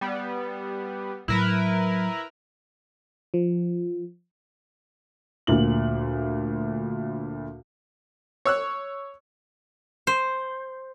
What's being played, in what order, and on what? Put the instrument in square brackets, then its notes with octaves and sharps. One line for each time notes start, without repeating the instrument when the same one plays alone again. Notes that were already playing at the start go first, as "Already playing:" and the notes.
[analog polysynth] G3 B3
[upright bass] A2 F#3 [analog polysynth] E4 A#4 B4
[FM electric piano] F3
[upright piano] D2 A#2 F#7
[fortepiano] C#5 E6 F#6
[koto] C5